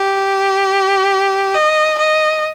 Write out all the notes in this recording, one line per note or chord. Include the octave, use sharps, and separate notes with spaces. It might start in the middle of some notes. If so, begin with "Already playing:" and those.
Already playing: G4
D#5
D#5